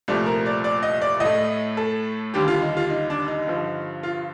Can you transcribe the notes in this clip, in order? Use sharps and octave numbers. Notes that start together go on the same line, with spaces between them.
C2 A#2 F3 A3 D5
A#4
D5
D5
D#5
D5
A2 D#5
A3
A4
D#2 D3 G3 G4
F4
D#4
F4
D#4
D4
D#4
G2 D3 F3
F4